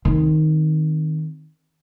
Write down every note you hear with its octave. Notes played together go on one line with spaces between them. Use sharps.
D#3 C4